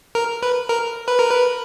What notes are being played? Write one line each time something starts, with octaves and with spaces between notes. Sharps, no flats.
A#4
B4
A#4
B4
A#4
B4